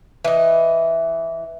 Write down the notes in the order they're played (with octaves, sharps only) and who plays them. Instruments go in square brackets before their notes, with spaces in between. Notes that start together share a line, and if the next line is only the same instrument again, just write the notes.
[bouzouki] E3 D#5